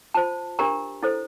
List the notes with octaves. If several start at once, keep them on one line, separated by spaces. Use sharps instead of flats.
F4 C5 A5
D4 G4 A#4 A#5
E4 A4 C5